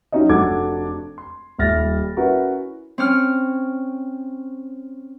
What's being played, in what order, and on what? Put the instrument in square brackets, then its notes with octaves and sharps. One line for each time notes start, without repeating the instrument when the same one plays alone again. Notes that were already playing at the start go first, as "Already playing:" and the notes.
[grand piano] F#3 C#4 D#4 C#5 D#5
F1 D4 F#4 A4 D6 G#6
C6
D#1 G3 E5 F6 A6 A#6
C#4 E4 F#4 A#4 B4
[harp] C4 C#4 F6